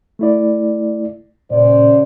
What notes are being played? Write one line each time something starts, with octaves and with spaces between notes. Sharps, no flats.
A3 E4 D5
A#2 C#3 C5 D5